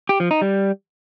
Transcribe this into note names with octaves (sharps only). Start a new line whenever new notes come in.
G4
F3
D#4
G3